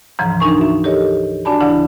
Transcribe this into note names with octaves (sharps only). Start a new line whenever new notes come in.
D2 G#2 C#3 E3 F3 A#5
D4 D#4 A#4 G#5 C6 C#6
F#4 E5
G4 A4 A#4 C#5 D#5
D4 F#4 D5 G#5 A5 B5
D2 C#3 E3 D4 E4 D5